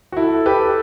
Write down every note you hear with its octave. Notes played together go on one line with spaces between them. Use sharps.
F#4
E4 A4
G4 B4